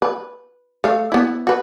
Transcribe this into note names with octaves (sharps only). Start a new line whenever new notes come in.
B4
A3 F5
B3 E4
F#4 B4